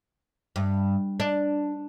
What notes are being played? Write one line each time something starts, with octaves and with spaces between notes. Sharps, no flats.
G2
D4